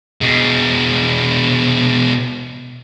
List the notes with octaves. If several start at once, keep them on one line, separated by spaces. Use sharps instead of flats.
B2 G#3